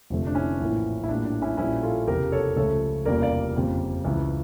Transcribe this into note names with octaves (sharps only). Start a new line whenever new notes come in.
F1 F2 D3 A3
D4
C#4 E4
A#1 A2 E3 A#3
E4
A#1 A2 G3 A#3 D4
D4
C#4 E4
A#1 A#2 G3 A#3 C#4 E4
F4 A4
F1 E2 C#3 G4 A#4
A4 C#5
C#2 C#3 F3 A3 A4 C#5
F1 E2 C#3 G3 A#3 A#4 D5
D5 F5
G1 F2 C#3 G3 A#3
C#2 C#3 E3